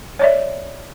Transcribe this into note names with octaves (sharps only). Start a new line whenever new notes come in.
C#5 D5 E5